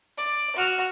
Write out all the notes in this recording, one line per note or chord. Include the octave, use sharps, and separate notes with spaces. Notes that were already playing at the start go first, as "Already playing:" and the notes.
D5
F#4 F6